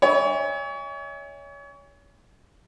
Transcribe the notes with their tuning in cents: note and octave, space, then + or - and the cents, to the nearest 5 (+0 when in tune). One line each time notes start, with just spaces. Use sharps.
C#5 +35 E5 -45 G#5 -35